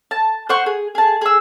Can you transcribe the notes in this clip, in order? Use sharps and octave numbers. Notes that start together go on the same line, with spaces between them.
A5
C5 F#5 C#6
G#4
G#4 A5
G#4 E6